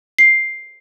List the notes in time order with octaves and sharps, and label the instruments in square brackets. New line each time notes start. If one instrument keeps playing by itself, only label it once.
[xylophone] C7